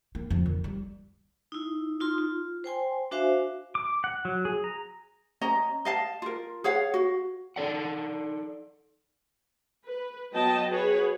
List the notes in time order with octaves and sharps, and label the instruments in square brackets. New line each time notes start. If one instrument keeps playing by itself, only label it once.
[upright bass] A#3
F2
D#3
G3
[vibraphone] D#4 E4
D#4 F4 C6
F4
C5 G5 G#5 C6
D4 F#4 C5 E5 F5 G#5
[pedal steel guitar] D6
F#5
F#3
G#4
A#5
[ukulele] C#4 D#5 A#5
D#5 F5 A5
F4 A#4
G#4 C#5 F5 F#5
F#4
[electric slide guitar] D#4 A4 D5 F#5
[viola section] B4
F#3 B3 D#5 G5 A5
F#4 G#4 B4 C#5